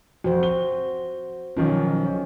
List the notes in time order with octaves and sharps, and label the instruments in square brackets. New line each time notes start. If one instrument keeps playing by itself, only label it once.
[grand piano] F2 [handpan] F#4 C5
[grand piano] G7
[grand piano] B1 D#3 F3 [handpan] C#4